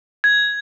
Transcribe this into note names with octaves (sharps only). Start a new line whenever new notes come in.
G#6